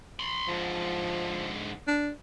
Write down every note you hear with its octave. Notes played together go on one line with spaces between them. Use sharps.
B5 C6
G#2 D3 F3
D4